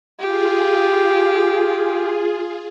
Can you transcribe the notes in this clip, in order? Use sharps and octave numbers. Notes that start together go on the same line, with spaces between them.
F4 G4 G#4